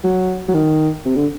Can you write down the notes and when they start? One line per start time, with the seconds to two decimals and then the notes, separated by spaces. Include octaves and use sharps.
0.04 F#3
0.48 F#3
0.54 D#3
1.05 C3
1.16 D3